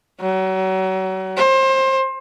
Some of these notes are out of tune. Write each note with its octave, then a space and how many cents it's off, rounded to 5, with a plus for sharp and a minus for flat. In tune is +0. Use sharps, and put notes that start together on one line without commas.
F#3 +35
C5 +25